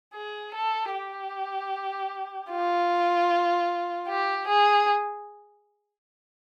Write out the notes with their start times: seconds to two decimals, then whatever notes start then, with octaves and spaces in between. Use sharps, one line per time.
0.14 G#4
0.54 A4
0.93 G4
2.51 F4
4.08 G4
4.48 G#4